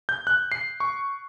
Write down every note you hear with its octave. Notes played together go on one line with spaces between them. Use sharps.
G6
F#6
C7
C#6